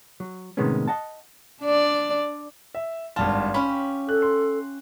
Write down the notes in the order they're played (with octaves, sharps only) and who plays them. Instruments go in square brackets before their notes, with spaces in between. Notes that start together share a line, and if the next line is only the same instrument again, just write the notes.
[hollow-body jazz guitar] F#3
A2 C3 D#3 G#3 B3 C#4
D#5 F#5 A5
[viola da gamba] D4 D5
[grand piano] E5
[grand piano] G#1 G2 A5 [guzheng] F4
[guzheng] C#4 G4 [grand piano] B5
[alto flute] A4 [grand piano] F#6
[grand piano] C6